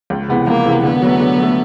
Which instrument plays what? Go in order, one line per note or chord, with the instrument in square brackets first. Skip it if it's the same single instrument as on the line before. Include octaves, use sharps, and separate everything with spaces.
[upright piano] C#2
C3 E3 G#3 B3
[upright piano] C#2 [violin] A#3
[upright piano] C3 E3 G#3 B3
[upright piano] D3 [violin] B3
[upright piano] F#3 A3
D3
F#3 A3